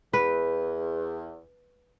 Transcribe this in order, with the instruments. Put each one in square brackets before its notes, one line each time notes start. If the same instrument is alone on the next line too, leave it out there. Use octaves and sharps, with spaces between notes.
[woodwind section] E2 [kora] B4